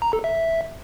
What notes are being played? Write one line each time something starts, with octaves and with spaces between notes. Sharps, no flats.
A#5
A4
E5